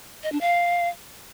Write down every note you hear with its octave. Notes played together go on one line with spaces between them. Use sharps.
D#5
D4
F5